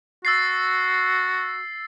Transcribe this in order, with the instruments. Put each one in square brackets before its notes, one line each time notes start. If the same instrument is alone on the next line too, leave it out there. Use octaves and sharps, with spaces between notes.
[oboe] F#4 [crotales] E6 A6 C7